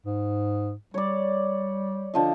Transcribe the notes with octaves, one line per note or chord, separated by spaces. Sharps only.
G#2
G3 C#5 D5
D3 F3 D#5